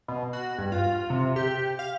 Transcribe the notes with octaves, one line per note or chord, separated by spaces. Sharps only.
B2
F#4
G2
F4
C3
G4
F5